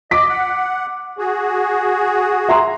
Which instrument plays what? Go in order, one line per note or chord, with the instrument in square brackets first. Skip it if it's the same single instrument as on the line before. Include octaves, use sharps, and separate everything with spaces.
[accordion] D#5 [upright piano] D6 B6
[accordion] F#5
F#4 G#4
[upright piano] E5 A#5 C6